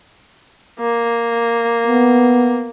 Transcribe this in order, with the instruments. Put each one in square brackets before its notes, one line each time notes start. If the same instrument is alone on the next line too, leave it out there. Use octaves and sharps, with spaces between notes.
[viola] A#3
[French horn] B3